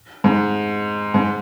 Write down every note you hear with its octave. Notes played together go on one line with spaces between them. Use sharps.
G#2
G#2